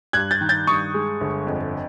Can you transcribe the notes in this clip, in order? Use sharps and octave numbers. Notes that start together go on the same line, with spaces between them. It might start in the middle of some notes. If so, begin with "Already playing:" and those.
G2 F#6 G#6
G6 A6
D#3
G6 A6
G2 C#6 D#6
G#3
G1
F2